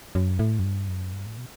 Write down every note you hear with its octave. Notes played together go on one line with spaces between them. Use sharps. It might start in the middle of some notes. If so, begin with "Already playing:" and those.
F#2
A2
F#2
G2
F#2
G2
A2
B2